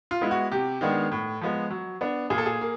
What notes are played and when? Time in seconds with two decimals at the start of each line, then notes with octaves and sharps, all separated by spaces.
0.11 F4
0.21 G#3 B3 E4
0.31 F#4
0.51 C3 G4
0.81 D#3 G#3 B3 D4
1.12 A2
1.41 F3 G#3 B3
1.70 F#3
2.01 B3 D4
2.30 A#2 G#4
2.38 A4
2.46 G#4
2.61 A#3